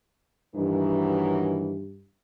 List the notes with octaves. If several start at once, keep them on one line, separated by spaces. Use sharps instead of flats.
G2 D#3 E3 F#3